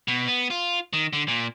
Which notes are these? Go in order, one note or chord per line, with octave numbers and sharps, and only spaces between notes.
B2
B3
F4
D#3
D3
A#2